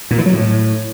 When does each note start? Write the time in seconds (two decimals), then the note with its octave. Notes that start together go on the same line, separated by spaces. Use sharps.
0.11 A#2
0.18 E3
0.26 F#3
0.34 A2